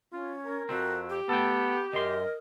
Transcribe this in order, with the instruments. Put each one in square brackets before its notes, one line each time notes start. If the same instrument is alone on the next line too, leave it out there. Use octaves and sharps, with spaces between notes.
[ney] C#4 [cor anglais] F4
[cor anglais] A#4
[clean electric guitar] F2 C4 [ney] F#4
[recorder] G4
[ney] A3 [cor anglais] B3 [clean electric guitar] A4 G5
[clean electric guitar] F#2 C6 [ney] A#4 [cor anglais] D#5